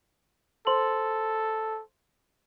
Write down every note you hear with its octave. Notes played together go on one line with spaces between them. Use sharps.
A4 C5 C6 F#7